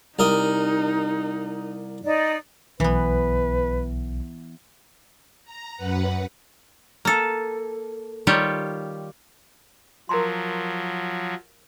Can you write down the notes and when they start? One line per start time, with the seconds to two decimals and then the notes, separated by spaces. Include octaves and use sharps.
0.19 C2 D#4 A#4 D#5
2.03 D#4 D5
2.80 B1 E3 B3 B4
5.45 A#5
5.77 F#2 B4 F#5
7.05 A#3 A4
8.27 D#3 G3 F4 G4 C#5
10.09 F3 F#3 A#4 A#5 C6